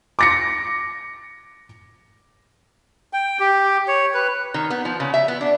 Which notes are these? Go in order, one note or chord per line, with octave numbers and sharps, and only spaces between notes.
D6 A#6 C#7
G5
G4
C#5
B4
D#3
B3
F3
C#3
E5
B3
D4